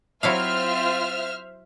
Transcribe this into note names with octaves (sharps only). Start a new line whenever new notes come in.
F#3 C4 E4 F4 C5 E5 F5 F6